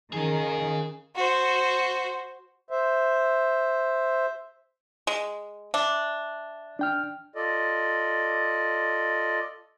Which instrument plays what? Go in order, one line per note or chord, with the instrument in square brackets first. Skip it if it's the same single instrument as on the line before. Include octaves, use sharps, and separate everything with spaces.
[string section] D#3 [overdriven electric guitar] C#4 G#4
[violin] F#4 C5
[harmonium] C5 E5
[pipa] G#3
[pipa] D4 [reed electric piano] E5
[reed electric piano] D4 G5 F6
[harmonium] F4 A4 D5 D#5